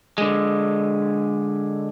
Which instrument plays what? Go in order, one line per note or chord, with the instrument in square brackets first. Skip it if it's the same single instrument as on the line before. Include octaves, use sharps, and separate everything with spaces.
[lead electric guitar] D3 G#3